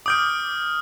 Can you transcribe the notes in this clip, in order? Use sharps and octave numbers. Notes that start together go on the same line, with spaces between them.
D6 D#6 F6 G6 D7